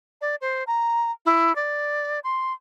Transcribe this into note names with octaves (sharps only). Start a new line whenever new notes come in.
D5
C5
A#5
E4
D5
C6